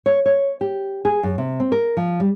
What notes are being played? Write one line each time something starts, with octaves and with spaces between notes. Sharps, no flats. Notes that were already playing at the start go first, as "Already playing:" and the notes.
C#5
C#5
G4
G#4
F#2
C3
C4
A#4
F3
G3